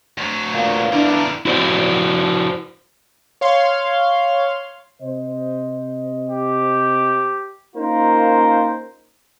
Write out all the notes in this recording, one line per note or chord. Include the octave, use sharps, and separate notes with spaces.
D2 F#3
A#2 B3 F5
D3 D4 E4 A#4
E4 F#4 C5 D5
C#5 F5 C6
C3 C5 D#5
G4
A#3 C#4 D#4 F4 A#4 C5